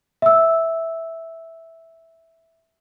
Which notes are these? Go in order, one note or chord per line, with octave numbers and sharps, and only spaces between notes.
E5 E6